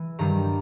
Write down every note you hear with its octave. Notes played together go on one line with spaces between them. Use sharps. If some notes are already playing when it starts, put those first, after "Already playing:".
Already playing: E3
G2 D#3 G3 A#5